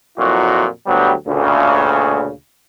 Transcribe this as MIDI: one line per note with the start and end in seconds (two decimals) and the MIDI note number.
0.18 0.65 41
0.18 0.65 46
0.18 0.65 54
0.18 0.65 64
0.18 0.65 66
0.87 1.12 38
0.87 1.12 54
0.87 1.12 55
0.87 1.12 59
0.87 1.12 62
0.87 1.12 67
1.27 2.30 38
1.27 2.30 46
1.27 2.30 49